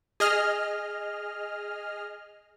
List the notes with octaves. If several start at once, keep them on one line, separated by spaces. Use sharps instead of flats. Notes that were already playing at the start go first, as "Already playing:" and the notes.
G#4 D#5 F6